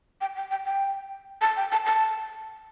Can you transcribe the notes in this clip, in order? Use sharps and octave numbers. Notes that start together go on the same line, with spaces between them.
G5
G5
G5
G5
A5
G5
A5
A5